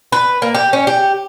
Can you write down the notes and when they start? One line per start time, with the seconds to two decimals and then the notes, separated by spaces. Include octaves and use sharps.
0.12 B4
0.42 A#3
0.55 G4
0.73 C#4
0.87 G4